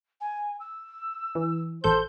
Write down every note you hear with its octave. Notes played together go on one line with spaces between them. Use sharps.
G#5
E6
E3
A1 A4 C5 G6